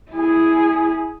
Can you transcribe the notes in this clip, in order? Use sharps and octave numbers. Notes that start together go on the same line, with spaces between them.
E4 G#4